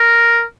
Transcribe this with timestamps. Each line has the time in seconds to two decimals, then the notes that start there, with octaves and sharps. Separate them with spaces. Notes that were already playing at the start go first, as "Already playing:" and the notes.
Already playing: A#4